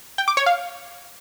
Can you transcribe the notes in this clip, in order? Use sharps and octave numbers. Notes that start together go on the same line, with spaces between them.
G5
D6
C#5
F5